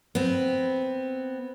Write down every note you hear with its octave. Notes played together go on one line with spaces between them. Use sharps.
B3 C4